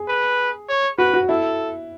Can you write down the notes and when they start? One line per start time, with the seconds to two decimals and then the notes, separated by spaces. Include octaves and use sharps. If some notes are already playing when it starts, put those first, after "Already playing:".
Already playing: G#4
0.08 B4
0.68 C#5
0.98 F#4 B4
1.14 F#4
1.29 E4 A4